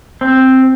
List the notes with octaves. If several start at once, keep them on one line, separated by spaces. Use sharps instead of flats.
C4